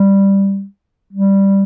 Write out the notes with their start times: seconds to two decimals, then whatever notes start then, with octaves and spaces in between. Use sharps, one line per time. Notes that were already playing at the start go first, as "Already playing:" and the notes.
Already playing: G3
1.13 G3